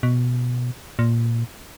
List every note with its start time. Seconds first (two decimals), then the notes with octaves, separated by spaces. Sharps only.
0.03 B2
0.99 A#2